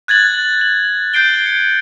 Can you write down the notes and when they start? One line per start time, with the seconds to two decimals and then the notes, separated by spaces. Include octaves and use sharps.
0.08 F#6 G#6 A6 F#7
0.61 F#7
1.14 G6 C7 D7 G7
1.46 C#7